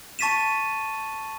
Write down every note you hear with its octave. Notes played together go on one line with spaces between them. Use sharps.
A5 C#6 A6 B6 D#7 E7